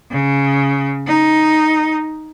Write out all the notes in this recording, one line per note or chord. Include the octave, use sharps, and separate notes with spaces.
C#3
D#4